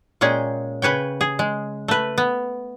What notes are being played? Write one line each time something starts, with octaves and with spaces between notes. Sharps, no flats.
A#2 G#3 C#4 G#4 G5
C#3 B4 C#5 G5
G#4
G#3
A3 B4
B3